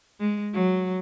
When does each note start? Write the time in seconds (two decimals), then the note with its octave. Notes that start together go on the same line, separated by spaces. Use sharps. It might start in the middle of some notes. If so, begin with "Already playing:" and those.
0.20 G#3
0.53 F#3